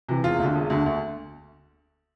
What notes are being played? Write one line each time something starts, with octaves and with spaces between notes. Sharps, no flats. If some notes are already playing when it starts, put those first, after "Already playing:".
C3 E3
E1 F4
D2 D3
E1
D2 D3
D2